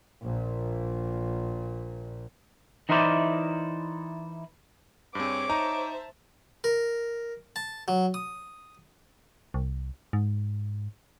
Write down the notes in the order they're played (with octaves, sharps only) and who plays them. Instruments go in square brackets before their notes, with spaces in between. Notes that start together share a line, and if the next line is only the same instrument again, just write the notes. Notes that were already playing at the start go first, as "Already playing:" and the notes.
[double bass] A#1 A#2
[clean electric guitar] E3 D#4 E4 A#4 C5 D5
[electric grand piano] G2 C4 [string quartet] G#4 C5 [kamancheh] C#5 D6
[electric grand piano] D#4 [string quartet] C5 E5 A5 [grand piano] A#5
[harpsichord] A#4
A5
F#3
D#6
[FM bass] C2
G#2